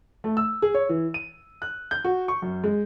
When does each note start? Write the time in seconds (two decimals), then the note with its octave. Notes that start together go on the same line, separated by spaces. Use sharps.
0.24 A3
0.37 E6
0.62 G#4
0.74 C#5
0.89 E3
1.14 D#7
1.62 F#6
1.91 G6
2.05 F#4
2.28 C#6
2.42 F#2
2.64 G#3